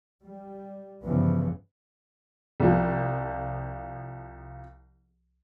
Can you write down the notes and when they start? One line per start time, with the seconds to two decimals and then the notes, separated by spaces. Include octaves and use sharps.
0.22 G3
1.04 G1 G2 C#3 E3 F3 B3
2.60 C2 F3